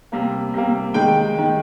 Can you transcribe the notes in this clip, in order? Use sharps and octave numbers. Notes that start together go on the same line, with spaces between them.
C3 G3 A#3
C3 G3 A#3
D#3 G#3 G5
D#3 G#3